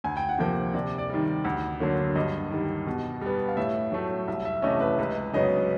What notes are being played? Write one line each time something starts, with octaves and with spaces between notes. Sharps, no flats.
D2 G#5
G5
F#5
C3 F3 A#3 G5
C3 D5
D5
D#3 G3
D2
D3 F#3 A#3
G2 D#5
D#3 G3
B2
G3 B3
F5
A2 E5
F#3 A3
C2 E5
E5
C3 E3 A3 C#4 D#5
B4
C#2 B4
C#3 F#3 B3 D#5